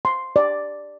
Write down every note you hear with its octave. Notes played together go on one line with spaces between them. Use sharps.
C6
D5